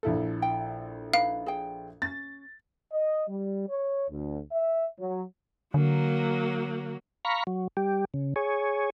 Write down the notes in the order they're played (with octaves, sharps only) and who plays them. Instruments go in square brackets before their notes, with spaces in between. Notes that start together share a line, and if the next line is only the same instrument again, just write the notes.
[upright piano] A#1 E4 A4
[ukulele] G5
[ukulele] D#4 B4 [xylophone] F5
[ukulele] G#4 G5
[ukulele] C#4 [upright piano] A6
[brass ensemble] D#5
G3
C#5
D2
E5
F#3
[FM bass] D3 [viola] F#3 A#3
[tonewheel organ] F5 A#5 B5 C#6
F#3
G3 G4
C#3
G#4 C#5